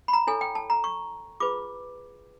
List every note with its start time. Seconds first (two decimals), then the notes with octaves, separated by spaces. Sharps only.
0.08 B5
0.13 A#5
0.27 E4 A4 C#5 G#5
0.41 G5
0.55 A5
0.70 A#5
0.84 C#6
1.40 F4 G#4 B4 D6